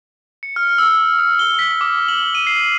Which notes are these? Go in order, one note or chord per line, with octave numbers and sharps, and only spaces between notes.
C#7
F6
E6
D#6
G7
B6
D6
F#7
D#7
C7